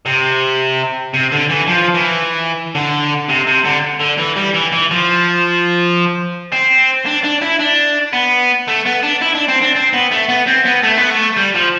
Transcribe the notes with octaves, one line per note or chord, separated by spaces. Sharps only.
C3
C3
D3
E3
F3
E3
D3
C3
C3
D3
D3
E3
G3
E3
E3
F3
C4
D4
D4
E4
D4
B3
A3
B3
D4
E4
D4
C4
D4
C4
B3
A3
B3
C4
B3
A3
B3
A3
G3
F3